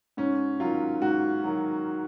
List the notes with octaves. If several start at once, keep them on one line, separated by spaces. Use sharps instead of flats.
G#2 C#4
D#3 F#3 F4
G#2 F#4
D#3 F#3